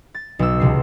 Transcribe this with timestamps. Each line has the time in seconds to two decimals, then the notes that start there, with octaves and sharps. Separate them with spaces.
0.14 A6
0.39 B1 E6
0.60 E1 C#2 C3 C7